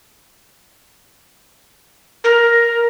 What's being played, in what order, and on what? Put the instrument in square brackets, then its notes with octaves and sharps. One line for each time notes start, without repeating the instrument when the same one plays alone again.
[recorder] A#4